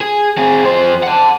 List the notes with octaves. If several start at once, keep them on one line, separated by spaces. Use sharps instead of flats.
G#4
C4 G#4
F2 C5
F#5 A5